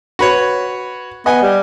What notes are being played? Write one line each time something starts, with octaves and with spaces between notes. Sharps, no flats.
F#4 B4 C#5
B3 D#5 G#5
G3